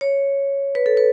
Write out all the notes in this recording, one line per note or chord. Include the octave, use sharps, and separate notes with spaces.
C#5
B4
A4
B4